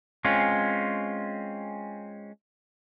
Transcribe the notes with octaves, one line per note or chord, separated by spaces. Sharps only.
G#3 C4 C#4 F4